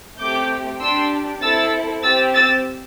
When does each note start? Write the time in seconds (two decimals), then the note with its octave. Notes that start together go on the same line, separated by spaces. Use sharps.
0.19 A3 C4 G4 D6 G6
0.81 D4 G4 C6 E6
1.42 C4 E4 A4 E6 A6
2.03 C4 G4 E6 A6
2.34 E6 A6